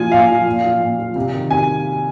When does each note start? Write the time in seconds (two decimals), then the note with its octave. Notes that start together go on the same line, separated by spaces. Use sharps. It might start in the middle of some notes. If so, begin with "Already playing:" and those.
Already playing: A#2 F3 G#5
0.12 A#2 F5
0.29 F3
0.46 A#2
0.64 F3
0.81 A#2
0.99 F3
1.16 C3
1.33 D#3
1.50 C3 G#5